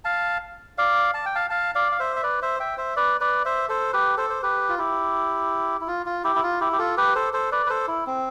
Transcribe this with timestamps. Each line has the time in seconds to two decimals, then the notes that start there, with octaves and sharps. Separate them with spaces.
0.05 F5 A5
0.78 D5 F5
1.14 A5
1.26 G5
1.35 F5 A5
1.50 F5 A5
1.75 D5 F5
1.92 F5
1.99 C5 E5
2.16 E5
2.23 B4 D5
2.42 C5 E5
2.60 E5 G5
2.77 C5 E5
2.96 B4 D5
3.21 B4 D5
3.45 C5 E5
3.69 A4 C5
3.93 G4 B4
4.17 A4 C5
4.30 C5
4.43 G4 B4
4.69 F4
4.78 E4 G4
5.81 E4
5.87 F4
6.06 F4
6.24 E4 G4
6.36 E4
6.43 F4
6.61 E4 G4
6.73 G4
6.78 F4 A4
6.97 G4 B4
7.15 A4 C5
7.33 A4 C5
7.52 B4 D5
7.66 B4
7.70 A4 C5
7.88 E4
8.07 C4